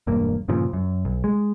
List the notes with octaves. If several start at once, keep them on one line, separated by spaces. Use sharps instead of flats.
E1 G2 A#3
G2 A#2 C#3 F3
F#2
B1
G#3